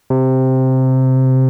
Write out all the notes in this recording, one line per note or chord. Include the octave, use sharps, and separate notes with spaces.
C3